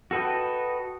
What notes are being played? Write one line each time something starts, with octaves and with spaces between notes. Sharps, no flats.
F#4 A4 B4 D#5 G5